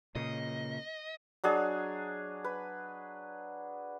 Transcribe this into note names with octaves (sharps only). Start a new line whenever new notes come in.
A#2 C#3 D#5
F#3 D4 G#4 D#5
B4